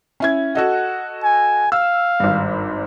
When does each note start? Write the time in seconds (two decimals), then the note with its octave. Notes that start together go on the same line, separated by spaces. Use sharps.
0.20 C#4 E4 G#6
0.55 F#4 A4 D#5 F#5
1.23 G#5
1.72 F5 E6
2.20 G#1 G2